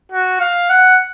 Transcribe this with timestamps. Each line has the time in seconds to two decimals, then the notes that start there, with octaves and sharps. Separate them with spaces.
0.12 F#4
0.40 F5
0.69 F#5